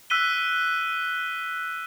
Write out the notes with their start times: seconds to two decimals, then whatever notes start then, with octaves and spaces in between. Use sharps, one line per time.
0.10 E6 F#6 B6 D#7 G7